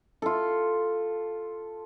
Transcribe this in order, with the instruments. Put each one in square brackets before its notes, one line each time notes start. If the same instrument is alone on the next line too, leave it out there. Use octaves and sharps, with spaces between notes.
[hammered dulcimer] F4 A4